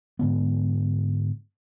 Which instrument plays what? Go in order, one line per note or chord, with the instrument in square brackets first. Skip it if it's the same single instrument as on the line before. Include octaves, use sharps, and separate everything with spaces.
[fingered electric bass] G#2 D3 B3